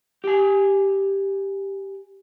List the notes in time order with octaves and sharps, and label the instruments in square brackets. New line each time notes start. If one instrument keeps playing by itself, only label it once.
[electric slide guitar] G4 G#5